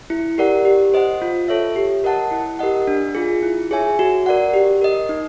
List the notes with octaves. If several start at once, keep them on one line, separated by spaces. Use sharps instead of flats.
E4
G4 A#4 D5 F#5
G4
C5 D#5 F#5
F4
A4 C#5 E5
G4
A#4 D#5 F#5 A5
E4
G4 A#4 D#5 F#5
D4
F4 G#4
E4
G#4 C#5 E5 G#5
F#4
A#4 D5 F#5
G4
A#4 D#5
D#4